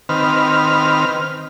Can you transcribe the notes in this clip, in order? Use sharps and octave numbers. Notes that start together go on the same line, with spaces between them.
D#3 C4 B4 F6